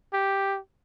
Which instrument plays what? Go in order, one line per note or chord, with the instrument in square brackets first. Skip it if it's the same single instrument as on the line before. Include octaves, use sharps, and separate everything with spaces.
[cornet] G4